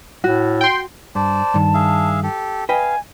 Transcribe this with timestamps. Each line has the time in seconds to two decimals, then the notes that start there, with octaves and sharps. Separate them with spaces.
0.24 A2 F#4
0.61 G5 C6
1.15 G2 C5 D5 A5
1.54 G2 D#3
1.74 G#4 E5 F5
2.23 G4 A4
2.69 B4 D#5 F5 G5 G#5